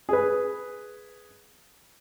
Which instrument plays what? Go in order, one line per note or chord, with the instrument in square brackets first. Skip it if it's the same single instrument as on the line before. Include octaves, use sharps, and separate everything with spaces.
[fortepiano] G#4 B4